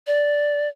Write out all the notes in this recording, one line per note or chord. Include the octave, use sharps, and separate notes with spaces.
D5